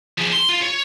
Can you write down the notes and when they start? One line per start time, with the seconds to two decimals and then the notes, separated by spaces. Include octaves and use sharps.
0.18 F3 G#4
0.32 C6
0.49 F4
0.62 C#5